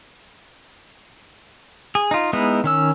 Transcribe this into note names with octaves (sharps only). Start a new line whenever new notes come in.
G#4
D#4 F4
G#3 B3 D#4 E4
D#3 C#4 E6